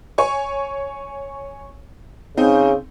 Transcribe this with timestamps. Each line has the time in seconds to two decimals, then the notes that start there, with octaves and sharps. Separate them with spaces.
0.18 C#5 G#5 C#6
2.37 C#3 C4 D#4